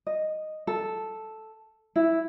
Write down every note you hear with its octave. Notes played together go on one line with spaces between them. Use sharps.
D#5
A4
E4